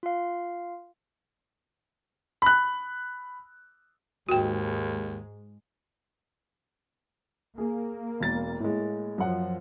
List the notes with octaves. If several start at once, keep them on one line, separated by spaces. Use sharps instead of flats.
F4 F5
B5 F#6
D#2 G#2 G#3 F#4 G5
A#3 G#4
E1 A6
A2 G#3
F#2 F3 F#5